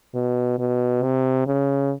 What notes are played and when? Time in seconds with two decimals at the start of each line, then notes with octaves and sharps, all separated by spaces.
0.15 B2
0.59 B2
1.03 C3
1.47 C#3